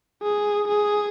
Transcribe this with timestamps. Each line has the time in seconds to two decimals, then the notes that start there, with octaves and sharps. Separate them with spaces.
0.23 G#4
0.68 G#4